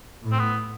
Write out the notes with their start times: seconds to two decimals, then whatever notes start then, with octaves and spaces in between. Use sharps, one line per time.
0.23 A2
0.32 C4
0.39 B3